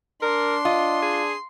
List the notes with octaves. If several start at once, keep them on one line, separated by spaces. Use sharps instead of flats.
D4 A#4 C6
F4 D#5
G#4